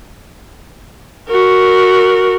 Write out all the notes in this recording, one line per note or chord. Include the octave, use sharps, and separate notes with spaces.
F#4 A#4